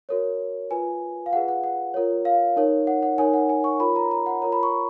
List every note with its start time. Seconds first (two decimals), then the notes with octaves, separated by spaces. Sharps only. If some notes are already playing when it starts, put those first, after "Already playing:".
0.09 F#4 A#4 C#5
0.71 F4 B4 G#5
1.26 F5
1.33 F4 G#4 B4 F#5
1.48 F#5
1.64 F#5
1.94 F4 A#4 C#5
2.25 F5
2.57 D#4 A#4 C#5
2.87 F#5
3.03 F#5
3.18 D#4 A#4 C#5 G#5
3.34 F#5
3.49 G#5
3.64 C#6
3.80 F4 A#4 C#5 B5
3.96 A#5
4.11 A#5
4.26 F#5
4.42 F4 A#4 C#5 A#5
4.52 B5
4.63 C#6